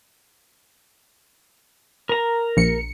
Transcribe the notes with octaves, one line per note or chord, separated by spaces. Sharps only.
A#4 A#5
A#1 C#7